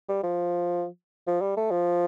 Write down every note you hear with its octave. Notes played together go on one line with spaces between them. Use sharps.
G3
F3
F3
G3
A3
F3